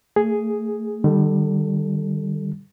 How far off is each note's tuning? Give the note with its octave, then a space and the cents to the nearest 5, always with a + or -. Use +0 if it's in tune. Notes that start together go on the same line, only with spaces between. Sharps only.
A3 +30 G#4 +0
D#3 -40 G3 +0 A4 +0